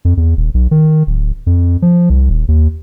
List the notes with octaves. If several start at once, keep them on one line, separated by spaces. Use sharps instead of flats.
F2
E2
D#1
B1
D#3
D1
F2
F3
C2
D#1
D#2